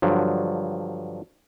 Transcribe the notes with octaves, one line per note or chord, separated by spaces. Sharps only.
G2 D3 F3 F#3